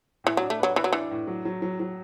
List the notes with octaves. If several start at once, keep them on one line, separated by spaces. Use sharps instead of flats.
A2 E3
F#3
D4
A3
F#3 B4
E3 B4
F#3
E3 D4
A2
F#3
F#3
F#3
F#3